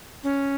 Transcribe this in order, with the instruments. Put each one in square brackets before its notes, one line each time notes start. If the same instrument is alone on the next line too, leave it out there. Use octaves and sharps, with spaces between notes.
[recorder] C#4